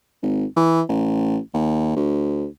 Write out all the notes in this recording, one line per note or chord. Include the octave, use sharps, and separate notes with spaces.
G#1
E3
A1
D#2
D2